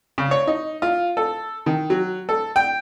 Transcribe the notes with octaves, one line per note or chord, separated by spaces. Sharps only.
C#3
C#5
D#4
F4
A4
D#3
F#3
A4
G5